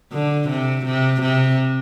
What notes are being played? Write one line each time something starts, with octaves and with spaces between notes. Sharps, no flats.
D3
C3
C3
C3